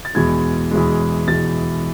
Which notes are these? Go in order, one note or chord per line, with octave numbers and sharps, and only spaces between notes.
A6
E2 B2 G#3 G#6
E2 B2 G#3
E2 B2 G#3 A6